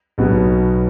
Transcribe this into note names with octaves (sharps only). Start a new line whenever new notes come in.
B1 B2 F#3 B3